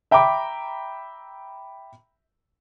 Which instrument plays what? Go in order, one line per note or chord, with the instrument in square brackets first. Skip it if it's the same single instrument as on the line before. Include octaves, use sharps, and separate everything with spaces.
[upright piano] E5 G5 A#5 B5 D6